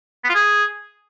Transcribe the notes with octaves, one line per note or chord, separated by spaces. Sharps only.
B3
F4
G#4